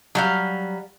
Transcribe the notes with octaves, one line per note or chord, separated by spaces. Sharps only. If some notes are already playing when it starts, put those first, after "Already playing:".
F#3 G3 F5